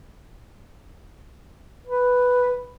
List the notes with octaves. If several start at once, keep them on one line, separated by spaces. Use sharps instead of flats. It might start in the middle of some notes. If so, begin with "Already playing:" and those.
B4